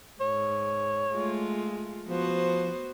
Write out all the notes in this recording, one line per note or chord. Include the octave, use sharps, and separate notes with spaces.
G#2 C#5
G#3 A3 F4
F3 B3 F#4 C5